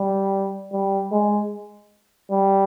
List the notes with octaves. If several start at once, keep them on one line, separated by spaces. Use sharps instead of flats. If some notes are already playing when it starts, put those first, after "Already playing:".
Already playing: G3
G3
G#3
G3